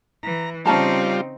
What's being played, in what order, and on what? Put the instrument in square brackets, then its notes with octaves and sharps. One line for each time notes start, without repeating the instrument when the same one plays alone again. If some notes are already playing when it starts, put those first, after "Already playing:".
[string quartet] E3 [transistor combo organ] A#5
[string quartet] C#3 C4 D#4 [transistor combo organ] G3 F4 [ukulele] C#4 A5 A#5